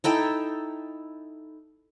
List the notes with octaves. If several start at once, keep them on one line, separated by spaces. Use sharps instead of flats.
D#4 E4 A4 G5